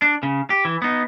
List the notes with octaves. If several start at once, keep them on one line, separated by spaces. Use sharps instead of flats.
D4
C#3
G4
E3
B3 D#4